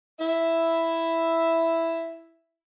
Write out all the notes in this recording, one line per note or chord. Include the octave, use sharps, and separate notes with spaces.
E4 E5